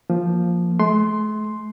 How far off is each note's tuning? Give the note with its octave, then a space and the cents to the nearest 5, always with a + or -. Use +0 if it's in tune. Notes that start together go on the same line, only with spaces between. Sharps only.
F3 +0 A#3 +0
A3 -45 C6 +0